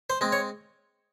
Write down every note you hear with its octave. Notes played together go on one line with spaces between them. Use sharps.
C5
G#3 C4
C#5